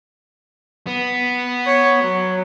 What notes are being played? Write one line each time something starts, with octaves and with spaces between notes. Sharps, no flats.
B3
C#5
F#3